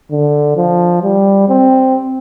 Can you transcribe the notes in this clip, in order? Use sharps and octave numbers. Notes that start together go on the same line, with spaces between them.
D3
F3
G3
C4